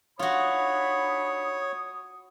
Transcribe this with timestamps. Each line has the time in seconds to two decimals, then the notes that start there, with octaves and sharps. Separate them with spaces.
0.19 D4 D#4 F4 F#4 C#5 B5 D#6